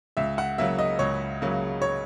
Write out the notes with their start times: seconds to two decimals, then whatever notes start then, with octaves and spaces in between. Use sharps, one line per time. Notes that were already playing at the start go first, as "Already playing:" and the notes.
0.17 C#2 E5
0.38 F#5
0.58 C#3 F#3 A#3 E5
0.79 D#5
0.99 C#2 C#5
1.41 C#3 F#3 A#3
1.82 C#5